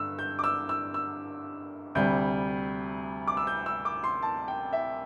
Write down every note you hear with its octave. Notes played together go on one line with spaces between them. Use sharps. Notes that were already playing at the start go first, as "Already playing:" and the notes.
Already playing: G2 D3 E6
G6
D6
E6
E6
E6
D2 C3 G3 G6
D6
E6
G6
E6
D6
C6
A5
G5
E5